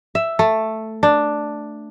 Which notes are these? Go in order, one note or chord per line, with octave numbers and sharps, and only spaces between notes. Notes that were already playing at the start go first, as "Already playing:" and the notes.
E5
A3
D4